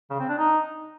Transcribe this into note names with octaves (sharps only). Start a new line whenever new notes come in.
C#3
C4
D4
D#4